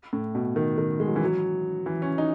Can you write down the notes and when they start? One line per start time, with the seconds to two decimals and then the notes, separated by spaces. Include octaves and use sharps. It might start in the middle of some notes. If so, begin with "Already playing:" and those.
0.13 A2
0.35 B2
0.56 D#3
0.78 D#3
1.00 G#3
1.08 F#3
1.16 E3
1.24 F#3
1.86 E3
2.02 C#4
2.18 D#4